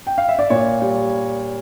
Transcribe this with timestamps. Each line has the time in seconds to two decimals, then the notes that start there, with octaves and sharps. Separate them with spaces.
0.07 G5
0.18 F5
0.29 E5
0.39 D5
0.50 A#2 C#5
0.82 G3